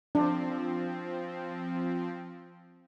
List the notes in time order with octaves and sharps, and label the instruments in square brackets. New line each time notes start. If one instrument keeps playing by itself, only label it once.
[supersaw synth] F3 C4 [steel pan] D4